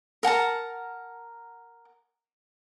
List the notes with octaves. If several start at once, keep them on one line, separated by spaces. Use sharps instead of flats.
A#4 F#5 A5 A#5